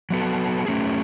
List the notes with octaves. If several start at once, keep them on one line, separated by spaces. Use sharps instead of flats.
F#3 B3 F#4 A4
F#3 A3 C#4 G#4